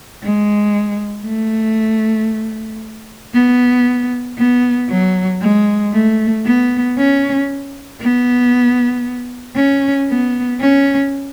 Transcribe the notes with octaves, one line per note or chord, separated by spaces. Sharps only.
G#3
A3
B3
B3
F#3
G#3
A3
B3
C#4
B3
C#4
B3
C#4